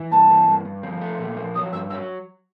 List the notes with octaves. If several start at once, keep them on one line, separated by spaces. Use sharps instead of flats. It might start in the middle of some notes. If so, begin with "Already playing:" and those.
Already playing: E3
G2 A5
E3
G2
G2
F3
A3
A#2
F3
F#3 D#6
G2 E6
F#3 E6